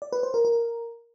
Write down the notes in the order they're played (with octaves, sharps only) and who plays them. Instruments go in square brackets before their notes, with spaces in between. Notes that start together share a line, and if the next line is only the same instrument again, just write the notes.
[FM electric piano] D5
B4
C5
A#4
A#4